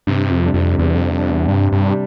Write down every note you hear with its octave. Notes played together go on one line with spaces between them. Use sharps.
G2 C3
F2
G3 D4
F2
E2 C3
F2
E2
F2 G3 D4
E2
G2 C3
G2
G3 D4